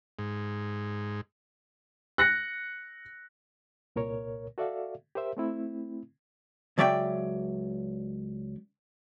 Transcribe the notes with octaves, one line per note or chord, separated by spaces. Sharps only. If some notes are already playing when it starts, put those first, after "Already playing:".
G#2
F#6 A#6 C#7
C2 A#2 A#4 C#5
F#4 A4 D5 E5 F5
G4 A#4 C5 E5
A3 C4 E4
C#2 F#3 D5 E5 G5